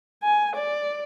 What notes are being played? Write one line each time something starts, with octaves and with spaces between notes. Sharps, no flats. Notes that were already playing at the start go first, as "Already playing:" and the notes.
G#5
D5